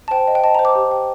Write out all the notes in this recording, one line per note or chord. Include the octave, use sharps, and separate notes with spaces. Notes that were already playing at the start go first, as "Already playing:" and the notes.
A5
C5 G5
D#5
G5
D#5 A5
C5 A#5
D6
G4
G5